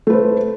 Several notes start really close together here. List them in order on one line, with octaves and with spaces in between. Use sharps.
A3 B4 C5